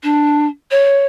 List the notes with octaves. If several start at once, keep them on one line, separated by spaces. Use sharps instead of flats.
D4
C#5